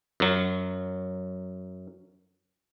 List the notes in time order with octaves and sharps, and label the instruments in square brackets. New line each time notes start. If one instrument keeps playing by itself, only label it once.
[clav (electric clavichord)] F#2 F#3